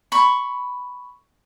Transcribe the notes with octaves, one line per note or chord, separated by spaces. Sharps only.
B5 C#6